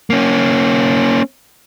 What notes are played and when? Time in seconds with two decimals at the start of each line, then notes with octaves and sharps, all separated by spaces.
0.10 A#3 C#4